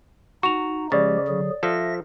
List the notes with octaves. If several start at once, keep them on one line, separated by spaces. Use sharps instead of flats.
D#4 F#4 C#6 F7
C#3 F3 G#3 G4 D5 A6
D3 F#3 G#4
F3 A4 E5 A#6